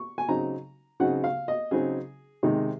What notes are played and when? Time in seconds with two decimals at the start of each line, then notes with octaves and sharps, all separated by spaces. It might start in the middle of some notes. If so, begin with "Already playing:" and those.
Already playing: C#6
0.18 G#5
0.28 C#3 F#3 C4 D#4 A#5
1.00 C#3 F#3 C4 D#4 F#5
1.24 F5
1.48 D#5
1.71 C#3 F#3 C4 D#4 G#4
2.43 C3 D#3 G#3 D#4